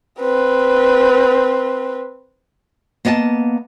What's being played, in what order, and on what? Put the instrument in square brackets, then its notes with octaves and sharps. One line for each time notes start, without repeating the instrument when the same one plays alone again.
[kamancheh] C4 B4
[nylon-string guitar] A#3 B3 D#5 F5 A5